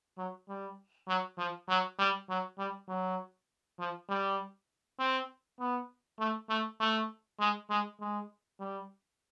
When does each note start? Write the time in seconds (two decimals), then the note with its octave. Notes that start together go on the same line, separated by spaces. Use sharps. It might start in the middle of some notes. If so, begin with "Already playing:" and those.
0.18 F#3
0.49 G3
1.08 F#3
1.38 F3
1.69 F#3
1.99 G3
2.29 F#3
2.58 G3
2.89 F#3
3.79 F3
4.09 G3
4.99 C4
5.59 B3
6.19 A3
6.50 A3
6.80 A3
7.40 G#3
7.70 G#3
8.00 G#3
8.60 G3